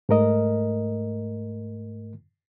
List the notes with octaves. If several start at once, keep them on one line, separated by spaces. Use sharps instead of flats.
G#2 A3 A#4 D#5